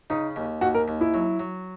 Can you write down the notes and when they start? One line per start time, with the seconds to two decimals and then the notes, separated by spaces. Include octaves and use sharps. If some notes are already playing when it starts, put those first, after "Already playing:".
0.10 C#3 D#4
0.36 D#2
0.61 D#2 F#4
0.75 A#4
0.88 D#2
1.01 E4
1.14 F#3
1.40 F#3